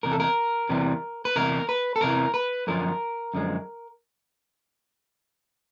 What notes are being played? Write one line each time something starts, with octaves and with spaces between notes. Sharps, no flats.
E2 C3 A#4
A4
A#4
E2 C3 E3 G3
B4
E2 C3 A#4
B4
A4
E2 C3 E3 A#4
B4
F#2 D3 F3 A#4
F#2 D3 F3 G#3